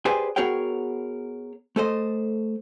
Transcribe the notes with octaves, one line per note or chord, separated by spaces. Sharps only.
G4 G#4 B4 C5 D5 G#5
B3 F#4 G#4 A#4 C#5 G5
A3 A4 C5 D#5